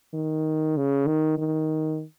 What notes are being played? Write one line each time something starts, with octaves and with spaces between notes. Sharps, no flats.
D#3
C#3
D#3
D#3